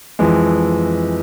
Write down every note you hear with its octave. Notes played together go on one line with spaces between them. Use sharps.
F2 E3 G#3